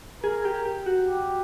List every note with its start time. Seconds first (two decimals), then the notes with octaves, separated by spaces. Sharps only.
0.24 G#4 A#4
0.45 G4
0.65 G4
0.86 F#4
1.07 G4